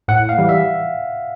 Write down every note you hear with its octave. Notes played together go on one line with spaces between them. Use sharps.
A2 F#5
F5
E3 G3
E5